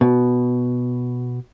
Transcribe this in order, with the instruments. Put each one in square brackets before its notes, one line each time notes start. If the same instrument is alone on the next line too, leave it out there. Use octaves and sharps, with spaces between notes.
[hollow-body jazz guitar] B2